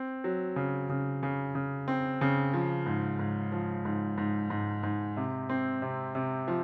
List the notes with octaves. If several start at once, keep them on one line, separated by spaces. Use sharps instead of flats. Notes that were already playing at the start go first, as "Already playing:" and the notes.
Already playing: C4
F#3
C#3
C#3
C#3
C#3
C4
C#3
F3
G#2
G#2
F3
G#2
G#2
G#2
G#2
C3
C4
C3
C3
F3